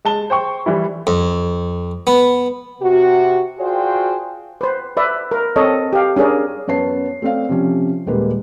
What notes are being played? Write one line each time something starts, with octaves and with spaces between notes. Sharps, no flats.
G#3 A5 G7
C5 G5 C#6
E3 G3 E4
F2
B3
C3 F#4
F4 F#4 G#4 C5 D5 G5
B4 C5
B4 D5 E5
A#4
C4 A4 C#5 D#5
G4 F5
C#4 D4 G#4 A#4 D5
F#2 B3 C#5 A5 C7
A3 C4 D5 F5
C3 F3 C#4
D#1 G3 G#3 A#3 B4